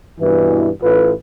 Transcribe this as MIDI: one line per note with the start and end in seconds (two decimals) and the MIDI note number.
0.21 0.70 43
0.21 0.70 47
0.21 0.70 52
0.83 1.13 33
0.83 1.13 45
0.83 1.13 65
0.83 1.13 71